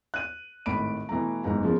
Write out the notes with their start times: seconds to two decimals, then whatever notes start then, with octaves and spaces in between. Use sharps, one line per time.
0.14 F#6 D#7
0.66 G#1 A2 B5 D7
1.09 B2 E3 A3 A#5
1.44 F#1 E2 G#2 A#5
1.63 C#3 F3 A#4